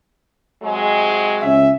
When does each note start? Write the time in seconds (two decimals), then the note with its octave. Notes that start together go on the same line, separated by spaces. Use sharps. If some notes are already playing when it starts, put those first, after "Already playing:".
0.63 C3 F#3 G#3
1.42 C#2 C#4 E5